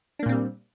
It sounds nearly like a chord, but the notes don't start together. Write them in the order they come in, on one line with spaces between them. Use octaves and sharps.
D4 A#3 A#2 C4 G3